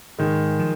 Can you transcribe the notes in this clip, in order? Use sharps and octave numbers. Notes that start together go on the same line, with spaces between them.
G#2 D#3 G#3
F3